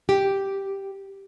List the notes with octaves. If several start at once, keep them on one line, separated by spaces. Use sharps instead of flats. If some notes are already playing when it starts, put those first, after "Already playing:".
G4